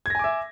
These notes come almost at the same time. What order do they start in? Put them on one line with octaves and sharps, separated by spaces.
G#6 A#6 G#5 D6 E5